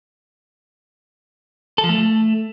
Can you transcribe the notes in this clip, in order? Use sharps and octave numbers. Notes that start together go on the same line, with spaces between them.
A4
F3
A3